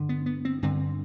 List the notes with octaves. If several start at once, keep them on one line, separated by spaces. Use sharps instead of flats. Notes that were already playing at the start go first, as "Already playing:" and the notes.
Already playing: G2 D3
B3
B3
C4
G2 D3 C4